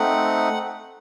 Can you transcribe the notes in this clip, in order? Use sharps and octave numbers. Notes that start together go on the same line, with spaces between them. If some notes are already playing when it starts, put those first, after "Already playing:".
Already playing: A3 C4 D#4 F#5